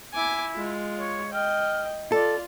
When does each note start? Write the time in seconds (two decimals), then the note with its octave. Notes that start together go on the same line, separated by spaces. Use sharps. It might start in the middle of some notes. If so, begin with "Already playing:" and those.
0.14 E4 G#5 D6
0.54 G#3 F4
0.97 C#5
1.33 D#5 G5 F6
2.12 F4 A4 D5